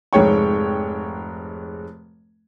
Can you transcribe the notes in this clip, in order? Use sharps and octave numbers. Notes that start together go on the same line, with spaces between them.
F1 G#2 G#3 C#5 G5 C#6